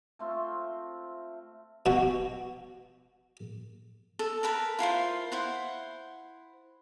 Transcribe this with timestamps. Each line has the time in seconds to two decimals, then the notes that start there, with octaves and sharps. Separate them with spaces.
0.19 A3 C4 F4 C5
1.86 B2 F#4
4.19 A4
4.43 A#4 B4 A5 B5
4.79 E4 F4 A#4 C5
5.32 E4 C5 F#5